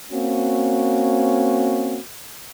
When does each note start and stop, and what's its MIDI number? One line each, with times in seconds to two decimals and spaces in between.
0.12 1.99 58
0.12 1.99 60
0.12 1.99 61
0.12 1.99 66